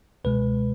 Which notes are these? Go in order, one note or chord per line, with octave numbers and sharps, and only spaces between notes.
C#2 B2 G#3 B4